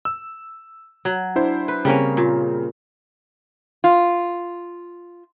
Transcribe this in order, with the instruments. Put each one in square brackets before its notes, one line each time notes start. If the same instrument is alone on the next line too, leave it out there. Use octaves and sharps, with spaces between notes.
[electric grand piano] E6
[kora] F#3
[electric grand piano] D4 E4 C5
[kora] B4
[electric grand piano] C#3 C4 [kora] G3 A#3 C#4
[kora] A#2
[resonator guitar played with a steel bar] F4